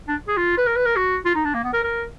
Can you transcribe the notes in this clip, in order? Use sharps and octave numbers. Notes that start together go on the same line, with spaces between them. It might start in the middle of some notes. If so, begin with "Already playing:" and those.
D4
G#4
F4
B4
A#4
B4
A#4
F#4
F4
D#4
D4
A#3
B3
A#4
A#4